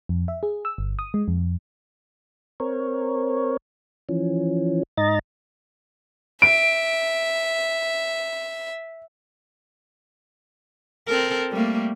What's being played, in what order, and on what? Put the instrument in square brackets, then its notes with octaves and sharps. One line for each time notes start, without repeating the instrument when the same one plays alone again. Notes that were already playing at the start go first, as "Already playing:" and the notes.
[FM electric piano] F2
E5
G#4
E6
G1
D#6
G#3
F2
[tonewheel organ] C4 A#4 C#5
E3 F3 C#4
G#2 D#4 D#5 A#5 A6
[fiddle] E5 [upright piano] D7
[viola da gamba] C4 A4 A#4
G3 A3 A#3